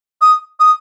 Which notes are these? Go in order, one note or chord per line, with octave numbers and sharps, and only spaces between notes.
D#6
D#6